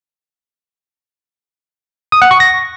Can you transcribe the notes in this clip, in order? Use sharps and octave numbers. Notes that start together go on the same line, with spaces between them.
D#6
F#5
C#6
A#6